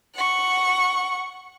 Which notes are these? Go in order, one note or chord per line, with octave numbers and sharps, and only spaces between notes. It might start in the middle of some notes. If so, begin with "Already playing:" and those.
F#5 C#6